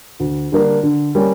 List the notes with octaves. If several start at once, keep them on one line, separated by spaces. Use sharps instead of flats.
D2
D3 G3 A#3 D4
D3
G3 A#3 C#4